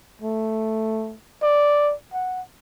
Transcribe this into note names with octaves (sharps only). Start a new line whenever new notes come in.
A3
D5
F#5